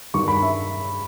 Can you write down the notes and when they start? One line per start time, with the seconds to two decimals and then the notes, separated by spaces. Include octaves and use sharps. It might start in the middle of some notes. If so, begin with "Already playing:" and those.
0.14 G2 D#3 G3 C#6
0.28 B5
0.42 E5